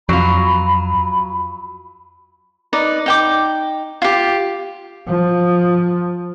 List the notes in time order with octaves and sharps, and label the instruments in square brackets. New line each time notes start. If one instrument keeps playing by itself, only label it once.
[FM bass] F2 [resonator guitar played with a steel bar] F#3 F4 [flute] B5
[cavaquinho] D#4 B4 D5
D#4 G5 D6
F4 G4
[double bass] F3